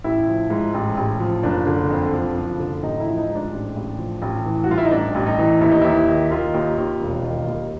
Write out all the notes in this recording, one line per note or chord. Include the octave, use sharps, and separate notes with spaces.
A1 E4
F3
G#2
A1
A1
F3
F#1 D4
D3
F2
F3
F#1
D3
A1 D#4
E4
F3
D#4
G#2
D4
A1
A1
F3
A1
E3
F#4
G2 F4
E4
D#4
A1 D4
A1
D#4
E3
D#2 E4
D#4
D#2 E4
D#3
D#3 F4
D#2
D#2
E1
D#3
D#2